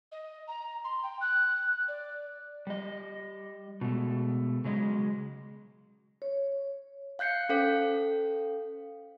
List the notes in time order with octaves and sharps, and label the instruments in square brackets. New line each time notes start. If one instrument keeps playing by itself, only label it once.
[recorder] D#5
A#5
C6
G5
F#6
D5
[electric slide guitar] G3 D#5
B2 G#3 A3
C#3 F#3 G#3 D#5
[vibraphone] C#5
[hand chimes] F5 F#6 G6 C7 C#7
C#4 A4 C5 F5